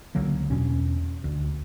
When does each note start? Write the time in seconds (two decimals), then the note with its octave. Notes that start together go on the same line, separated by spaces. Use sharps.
0.15 C#2 D3 F#3 A#3
0.50 E2 B2 C#4 D4
1.24 D2